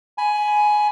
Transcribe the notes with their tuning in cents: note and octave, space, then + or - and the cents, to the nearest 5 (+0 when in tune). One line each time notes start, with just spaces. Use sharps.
G#5 +15 B5 +0